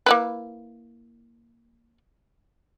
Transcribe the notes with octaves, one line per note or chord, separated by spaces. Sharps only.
A#3 E4 B4